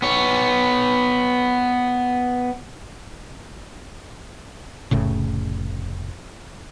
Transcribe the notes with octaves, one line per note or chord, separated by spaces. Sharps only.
B3 C#5
F1 A2 C#3